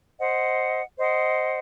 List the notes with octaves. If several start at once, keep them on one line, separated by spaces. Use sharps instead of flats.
C5 D#5 F#5
C5 D#5 F#5